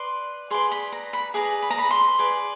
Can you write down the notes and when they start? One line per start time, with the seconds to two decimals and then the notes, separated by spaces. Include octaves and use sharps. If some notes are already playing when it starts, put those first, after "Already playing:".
Already playing: B4 D5 C6
0.51 G#4 B4 D5 C6
0.72 B5
0.92 A#5
1.13 B5
1.34 G#4 B4 D5 A#5
1.62 B5
1.70 A#5
1.78 B5
1.91 C6
2.19 G#4 B4 D5